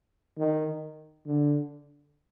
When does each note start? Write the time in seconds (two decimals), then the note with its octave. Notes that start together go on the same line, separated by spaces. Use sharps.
0.38 D#3
1.26 D3